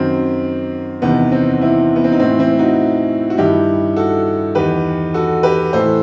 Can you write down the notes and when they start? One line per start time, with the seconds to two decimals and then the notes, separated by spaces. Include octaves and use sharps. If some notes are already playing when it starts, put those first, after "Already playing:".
Already playing: F#2 D#3 C4
1.02 E2 C3 D#3 B3
1.32 C4
1.61 C4 E4
1.96 B3
2.04 C4
2.12 D#4
2.20 A2 E3 C4 E4
2.39 C4 E4
2.59 D#4 F#4
3.30 F#4
3.37 G2 D#3 E4 G4
3.96 F#4 A4
4.55 E2 D#3 G4 B4
5.14 F#4 A4
5.43 G4 B4
5.73 A2 E3 A4 C5